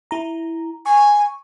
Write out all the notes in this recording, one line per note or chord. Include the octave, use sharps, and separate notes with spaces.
E4 A#5
G#5 C#6